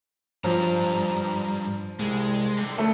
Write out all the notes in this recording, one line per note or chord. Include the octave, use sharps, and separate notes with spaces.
G2 F3 A#5
C2 G#3
D3 C4
D2 A3